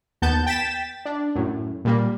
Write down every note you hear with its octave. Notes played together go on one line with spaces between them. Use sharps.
D#2 B3 A5 G6
G5 A6 B6 E7
D4
F#2 A2
A#2 G3 A#3